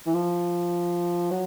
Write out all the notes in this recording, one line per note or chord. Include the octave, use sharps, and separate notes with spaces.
E3
F3
F#3